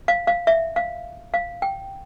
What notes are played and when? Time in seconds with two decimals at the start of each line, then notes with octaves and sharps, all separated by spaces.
0.08 F5
0.27 F5
0.47 E5
0.76 F5
1.34 F5
1.62 G5